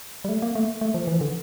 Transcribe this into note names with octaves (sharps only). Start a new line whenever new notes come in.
G3
A3
A#3
A3
A3
F3
E3
D3